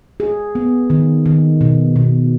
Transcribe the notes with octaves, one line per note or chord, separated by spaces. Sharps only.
G#4
B3
D#3
D#3
B2
B2